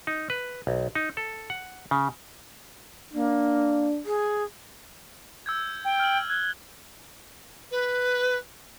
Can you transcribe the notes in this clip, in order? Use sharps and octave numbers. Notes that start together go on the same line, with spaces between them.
D#4
B4
B1
D#4
A4
F#5
C#3
A#3 D4
G#4
E6 G6 G#6
G5
F6 F#7
F#6 G#6 G7
B4